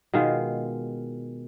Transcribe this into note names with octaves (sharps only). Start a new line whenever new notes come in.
B2 D#3 G#3 F4